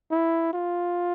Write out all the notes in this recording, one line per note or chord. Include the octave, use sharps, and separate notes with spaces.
E4
F4